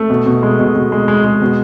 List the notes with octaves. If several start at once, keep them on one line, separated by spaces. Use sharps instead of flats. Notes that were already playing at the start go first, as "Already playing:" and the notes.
Already playing: A3
B2
B2
G#3
B2
B2
G#3
G#3
G#3
B2